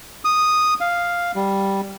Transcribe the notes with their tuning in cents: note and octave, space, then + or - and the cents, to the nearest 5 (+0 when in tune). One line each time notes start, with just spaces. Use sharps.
D#6 -5
F5 +0
G3 +0